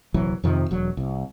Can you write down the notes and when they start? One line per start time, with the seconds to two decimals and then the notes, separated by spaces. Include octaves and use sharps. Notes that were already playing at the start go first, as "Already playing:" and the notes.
0.14 D#1 C2 E3 F#3
0.44 F2 C3 D#3 F3
0.71 E1 F#3
0.97 C2